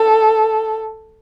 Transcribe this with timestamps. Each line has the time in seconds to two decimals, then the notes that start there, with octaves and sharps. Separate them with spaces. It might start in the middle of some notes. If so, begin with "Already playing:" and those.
Already playing: A4